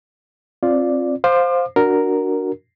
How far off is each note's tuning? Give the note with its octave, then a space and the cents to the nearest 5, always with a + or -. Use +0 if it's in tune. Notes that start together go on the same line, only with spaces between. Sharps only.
C4 +25 F4 +0 D5 +0
C5 +0 F5 +15 D6 +40
D4 +0 F#4 +0 A#4 +0